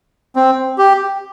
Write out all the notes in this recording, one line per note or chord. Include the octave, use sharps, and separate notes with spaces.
C4
G4